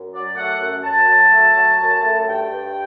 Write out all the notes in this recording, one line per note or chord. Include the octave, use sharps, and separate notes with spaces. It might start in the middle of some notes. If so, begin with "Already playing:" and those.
Already playing: F#2
F#3 D5
A3 F#5
F#2
F#2 A5
F#3
A3
F#3
F#2
A3
G2 G5
G2